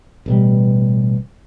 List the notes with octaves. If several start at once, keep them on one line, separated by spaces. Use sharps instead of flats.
A1 B2 G3